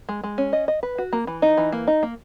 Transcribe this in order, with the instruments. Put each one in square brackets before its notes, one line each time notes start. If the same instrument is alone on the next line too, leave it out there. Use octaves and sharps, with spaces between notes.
[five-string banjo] G#3
G#3
C#4
D#5
D#5
B4
F#4
A#3
E3
D#4
E3
A#3
D#4
A#3